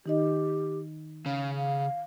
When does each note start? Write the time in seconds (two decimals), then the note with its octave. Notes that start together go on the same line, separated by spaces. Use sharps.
0.06 D#3 D#4 G4 D#5
1.26 C#3 F5
1.57 F5